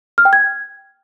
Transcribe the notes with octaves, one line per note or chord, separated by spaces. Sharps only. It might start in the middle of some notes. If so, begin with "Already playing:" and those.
F6
G5
G#6